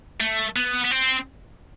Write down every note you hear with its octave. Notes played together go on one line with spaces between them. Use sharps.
A3
B3
B3
C4